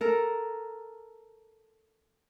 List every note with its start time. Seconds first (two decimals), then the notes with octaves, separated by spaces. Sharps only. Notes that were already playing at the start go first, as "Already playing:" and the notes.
0.01 A4 A#4